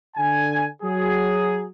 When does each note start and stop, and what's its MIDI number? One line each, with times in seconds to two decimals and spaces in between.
0.17 0.65 50
0.17 0.65 80
0.82 1.65 54
0.82 1.65 68